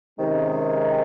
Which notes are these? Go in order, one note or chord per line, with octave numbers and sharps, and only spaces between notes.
C3 D#3 G#3 C#4 G#4